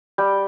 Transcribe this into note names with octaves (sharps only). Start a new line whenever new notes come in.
G3 G5